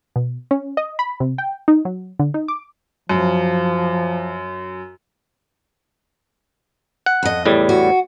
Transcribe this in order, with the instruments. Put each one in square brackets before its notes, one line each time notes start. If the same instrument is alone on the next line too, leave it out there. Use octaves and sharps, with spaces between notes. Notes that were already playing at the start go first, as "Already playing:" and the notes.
[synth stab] B2
C#4
D#5
B5
C3
G5
D#4
F#3
D3
D#4
D6
[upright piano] F#2 [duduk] F3
[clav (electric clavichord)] F#5
[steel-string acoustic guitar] F2 D#5
[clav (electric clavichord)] E2 A2 G3
[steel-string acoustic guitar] F#4